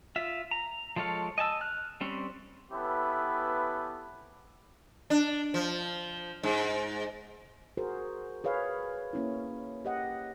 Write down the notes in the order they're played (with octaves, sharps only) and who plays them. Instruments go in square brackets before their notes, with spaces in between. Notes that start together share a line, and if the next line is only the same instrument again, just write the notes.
[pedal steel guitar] F4 E5
A#5
F3 G#3 A4 C#5 F5
D#5 G#5 A5 E6
F6 F#6
G3 C4 C#4
[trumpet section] B3 C#4 E4 G4 A4 B4
[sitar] D4
F3
G#2
[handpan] F#4 G#4 A#4 C5
G#4 B4 C#5 F5
A#3 C#4 E4
G4 D#5 F#5